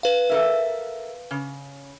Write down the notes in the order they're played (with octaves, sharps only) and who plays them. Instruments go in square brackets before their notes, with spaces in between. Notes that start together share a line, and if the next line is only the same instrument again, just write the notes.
[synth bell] B4 F5
[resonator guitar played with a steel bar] A4 A#4 E5
C#3